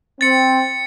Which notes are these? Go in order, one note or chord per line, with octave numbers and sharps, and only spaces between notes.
C4 A6 C#7